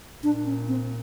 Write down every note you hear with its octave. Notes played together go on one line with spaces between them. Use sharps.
A#2 D4
C#4
C4